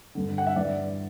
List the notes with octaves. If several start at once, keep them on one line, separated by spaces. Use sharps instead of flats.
G2 D3
F#5
E5
G2 E3 D5